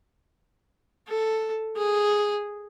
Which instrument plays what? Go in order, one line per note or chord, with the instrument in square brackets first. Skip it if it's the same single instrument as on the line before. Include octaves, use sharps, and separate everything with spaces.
[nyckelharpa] A4
G#4